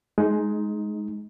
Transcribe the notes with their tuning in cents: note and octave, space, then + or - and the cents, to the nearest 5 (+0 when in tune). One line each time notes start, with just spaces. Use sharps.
G#3 +20 D#4 +0